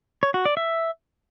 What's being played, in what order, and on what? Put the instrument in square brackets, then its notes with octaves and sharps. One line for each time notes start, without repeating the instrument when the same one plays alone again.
[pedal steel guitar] C#5
F#4
D5
E5